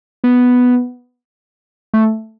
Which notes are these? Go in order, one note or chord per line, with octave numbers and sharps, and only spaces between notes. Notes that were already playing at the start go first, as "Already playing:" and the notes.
B3
A3